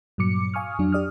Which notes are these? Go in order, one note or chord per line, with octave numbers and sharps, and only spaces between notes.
G2 A#2 F#3 D6 C#7
F5 G#5 C#6 D#6 F6
F2 F#3 D4
G4 D5 D#6 F6